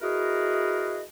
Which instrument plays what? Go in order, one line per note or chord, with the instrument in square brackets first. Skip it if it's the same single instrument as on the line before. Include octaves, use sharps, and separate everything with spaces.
[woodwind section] E4 F#4 G#4 A#4 B4 D#5